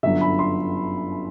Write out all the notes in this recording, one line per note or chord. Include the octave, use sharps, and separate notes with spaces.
G1 F#2 D3 F#3 E5
B5
C6